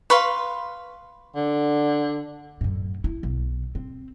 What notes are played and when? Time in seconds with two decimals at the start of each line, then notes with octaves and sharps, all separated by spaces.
0.10 B4 F5 C6 C#6
1.36 D3
2.61 F#2 A2
3.04 E4
3.23 B1
3.75 C4